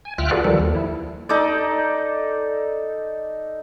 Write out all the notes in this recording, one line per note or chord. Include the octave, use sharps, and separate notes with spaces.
G#5
D2 F4 E5 G5 F6 F#6
F4 F#4 G#4 A4 B4 D5
D#3 F3 G3 A4
D#2
E4
D#4 A4 D5